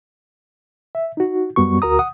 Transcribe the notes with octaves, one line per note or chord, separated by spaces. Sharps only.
E5
D#4 F#4
F#2 G3 B3 F#4 C#6
D2 F#4 A#4 A#5 D#6
F#5 D#6